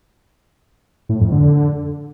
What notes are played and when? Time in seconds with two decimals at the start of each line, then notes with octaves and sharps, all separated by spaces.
1.09 A2
1.21 F2
1.32 D3